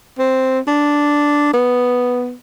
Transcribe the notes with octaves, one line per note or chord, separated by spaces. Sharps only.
C4
D4
B3